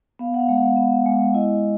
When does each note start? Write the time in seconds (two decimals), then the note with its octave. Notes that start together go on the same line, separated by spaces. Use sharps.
0.19 B3 F5
0.34 F#5
0.40 F5
0.49 G#3
0.58 F5
0.76 B3
1.06 G#3
1.34 E4 D#5